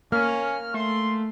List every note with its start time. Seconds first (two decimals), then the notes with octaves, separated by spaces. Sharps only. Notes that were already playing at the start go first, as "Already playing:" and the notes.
0.12 A#3 C#4 F6
0.74 A3 C6